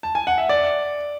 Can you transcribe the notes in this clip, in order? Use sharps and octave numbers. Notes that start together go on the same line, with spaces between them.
A5
G#5
F#5
E5
D5